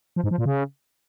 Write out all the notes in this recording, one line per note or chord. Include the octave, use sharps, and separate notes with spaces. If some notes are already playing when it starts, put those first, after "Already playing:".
F3
G#2
F3
A#2
C#3